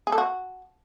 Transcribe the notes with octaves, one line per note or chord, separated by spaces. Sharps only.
G#4
A4
F#4